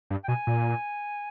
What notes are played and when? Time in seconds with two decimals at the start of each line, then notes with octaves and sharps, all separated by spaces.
0.11 G2
0.24 G5
0.28 B2 G#5
0.47 A#2